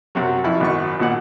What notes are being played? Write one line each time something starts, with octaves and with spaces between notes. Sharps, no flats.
F#2 C3 F#3
F2 E4
G#1 F#2 C#6
G#1 A#2 F#5